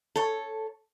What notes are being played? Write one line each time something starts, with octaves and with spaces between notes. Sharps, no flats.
A4 C#5